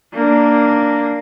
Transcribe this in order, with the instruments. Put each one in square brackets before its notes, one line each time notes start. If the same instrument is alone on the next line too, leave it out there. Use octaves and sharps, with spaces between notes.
[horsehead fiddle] A#3 D4